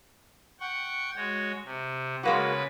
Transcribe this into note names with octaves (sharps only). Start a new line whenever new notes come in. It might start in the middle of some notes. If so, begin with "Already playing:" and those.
F#5 G5 C#6
G#3 F#4 C#5
C3
C#3 G#3 A#3 F#4 B4